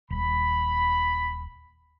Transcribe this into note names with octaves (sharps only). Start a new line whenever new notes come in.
D#1 B5